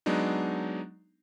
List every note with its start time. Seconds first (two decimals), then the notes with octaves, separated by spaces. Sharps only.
0.06 F#3 G#3 B3 D4 D#4